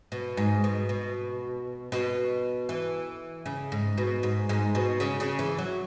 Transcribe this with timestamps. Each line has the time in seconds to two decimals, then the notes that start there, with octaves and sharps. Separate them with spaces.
0.12 B2
0.37 G#2
0.64 B2
0.89 B2
1.92 B2
2.69 E3
3.46 C#3
3.72 G#2
3.98 B2
4.23 G#2
4.49 G#2
4.75 B2
5.00 C#3
5.20 C#3
5.39 E3
5.58 F#3